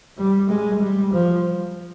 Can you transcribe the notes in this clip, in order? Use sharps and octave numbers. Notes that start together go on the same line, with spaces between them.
G3
G#3
G3
F3